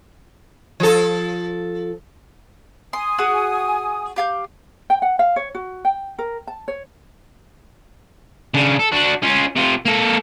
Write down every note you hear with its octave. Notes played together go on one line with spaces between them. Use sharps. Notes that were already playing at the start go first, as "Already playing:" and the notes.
F3 A4
G#5 C6 D#6
F#4 G#4 F#5
G4 F5 G6
G5
F#5
F5
C#5
F#4
G5
A#4
A5
C#5
C#3 D4
A4
D4 F#4
C#4 F4
C3 F4
A#3 A4